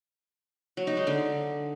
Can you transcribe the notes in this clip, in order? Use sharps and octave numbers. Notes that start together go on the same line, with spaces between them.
F#3
D#4
G#3
D3